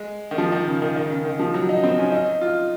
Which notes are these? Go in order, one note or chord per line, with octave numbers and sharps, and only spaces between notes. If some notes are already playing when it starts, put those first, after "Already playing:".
Already playing: G#3
D#3
F3
D#3
C#3
D#3
D#3
C#3
D#3
F3
F#3
D#4
C4
C#4
D#4
F4